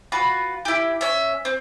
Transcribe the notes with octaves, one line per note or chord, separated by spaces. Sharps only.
F4 F#4 B4
E4 G4
C#4 E5
C4